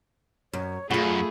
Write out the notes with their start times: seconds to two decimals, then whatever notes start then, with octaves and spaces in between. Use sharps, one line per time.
0.53 F#2 C#5
0.91 F#2 A3 F4 F#4 G#4 B5